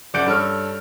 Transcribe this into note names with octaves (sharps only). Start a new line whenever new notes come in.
F#1 D5 F#5 G6 D7
G2 A4 C#5 F6